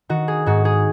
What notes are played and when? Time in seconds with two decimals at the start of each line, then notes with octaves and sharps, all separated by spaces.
0.09 D#3 F#4
0.28 G#4
0.46 G#2 F#4
0.65 G#4